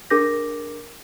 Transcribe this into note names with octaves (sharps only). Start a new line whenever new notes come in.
D4 G#4 A#4 D6 G6 A#6